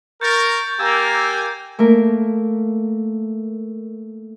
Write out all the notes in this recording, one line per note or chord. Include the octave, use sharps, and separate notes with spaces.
A#4 C#6 G6 A6
A#3 G4 A#4 G#5 E6 G#6
A3 A#3 A#4